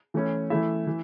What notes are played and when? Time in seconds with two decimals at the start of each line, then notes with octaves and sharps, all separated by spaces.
0.14 E3 A3 C#4 E4
0.50 E3 A3 E4 E5
0.87 E3